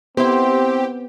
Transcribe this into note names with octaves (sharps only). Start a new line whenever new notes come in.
B3 C4 E4 G4 C5